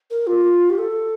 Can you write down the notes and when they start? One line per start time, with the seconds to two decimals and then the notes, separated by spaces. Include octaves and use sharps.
0.10 A#4
0.26 F4
0.69 G4
0.78 A4